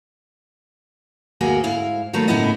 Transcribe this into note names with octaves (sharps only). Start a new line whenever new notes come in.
D2 A#3 F#4 G#4
G#2 E4 F5
D#3 F#3 A3 A#3 F4 B4
A2 C#3 A#3 B3 E4 D#5